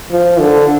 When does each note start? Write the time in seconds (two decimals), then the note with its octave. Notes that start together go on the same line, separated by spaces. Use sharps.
0.11 F3
0.40 D3